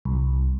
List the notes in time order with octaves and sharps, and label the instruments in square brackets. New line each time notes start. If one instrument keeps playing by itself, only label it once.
[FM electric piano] C2